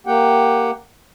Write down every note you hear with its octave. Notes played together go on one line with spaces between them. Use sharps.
A#3 G4 F#5 G5